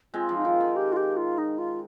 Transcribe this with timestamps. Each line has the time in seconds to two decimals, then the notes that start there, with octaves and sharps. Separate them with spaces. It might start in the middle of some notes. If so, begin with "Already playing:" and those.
0.14 G#3 C4 F4
0.29 F3
0.37 D#4
0.45 D#3 F4
0.60 D#3
0.76 G4
0.92 F4
0.96 G4
1.16 F4
1.38 D#4
1.58 F4